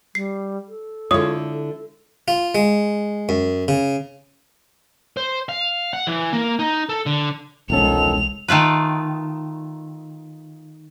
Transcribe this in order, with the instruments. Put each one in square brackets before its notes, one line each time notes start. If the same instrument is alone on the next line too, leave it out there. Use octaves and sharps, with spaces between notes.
[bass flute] G3 [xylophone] C7
[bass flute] A4
[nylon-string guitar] D3 E4 [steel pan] G#3 F4 C#5 [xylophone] D#6
[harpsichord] F4
G#3
F#2
C#3
[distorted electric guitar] C5
F5
F#5
E3
A#3
D#4
A4
D3
[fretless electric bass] E1 C#4 [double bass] C2 G#3 [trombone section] D#3 F3 A4 [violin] F7
[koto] D#3 A3 F4 B4